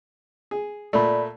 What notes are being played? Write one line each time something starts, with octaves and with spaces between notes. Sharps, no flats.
G#4
A#2 A3 D5 B5